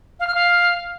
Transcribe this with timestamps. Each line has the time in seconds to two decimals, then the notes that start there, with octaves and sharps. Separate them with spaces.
0.20 F5
0.27 F6
0.35 F5